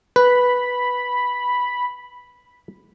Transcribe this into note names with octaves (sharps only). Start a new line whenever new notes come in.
B4 B5